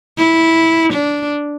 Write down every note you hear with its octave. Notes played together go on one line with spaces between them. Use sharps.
E4
D4